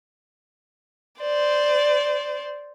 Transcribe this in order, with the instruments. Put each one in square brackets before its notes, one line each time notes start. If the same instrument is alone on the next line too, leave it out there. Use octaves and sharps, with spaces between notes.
[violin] C5 D5